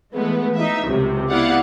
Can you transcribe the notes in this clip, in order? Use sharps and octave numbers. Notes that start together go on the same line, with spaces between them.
E3 G#3 A3 B3
D#4 E5
C#2 F#2 C3
B3 E4 G4 D5 F5 F#5